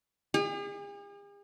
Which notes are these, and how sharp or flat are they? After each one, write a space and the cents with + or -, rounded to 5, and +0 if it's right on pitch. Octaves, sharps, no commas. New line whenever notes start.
G#4 -45